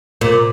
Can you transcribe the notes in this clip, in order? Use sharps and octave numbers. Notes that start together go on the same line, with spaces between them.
A#2